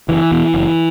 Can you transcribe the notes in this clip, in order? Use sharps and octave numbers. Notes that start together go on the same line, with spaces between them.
F#1 E3
E2 B2
F#1